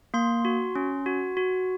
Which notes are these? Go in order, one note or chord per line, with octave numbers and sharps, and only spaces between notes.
A#3 C6
F#4
C#4
F#4
F#4